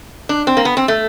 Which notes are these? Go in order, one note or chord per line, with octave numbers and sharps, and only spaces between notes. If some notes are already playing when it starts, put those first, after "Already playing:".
D4
C4
A#3
B3
C4
A3